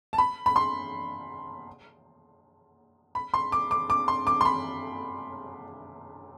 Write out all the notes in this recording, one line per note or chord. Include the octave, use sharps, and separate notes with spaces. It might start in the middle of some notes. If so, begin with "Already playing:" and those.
A5
B5
B5
C6
B5
C6
D6
D6
D6
C6
D6
C6
B5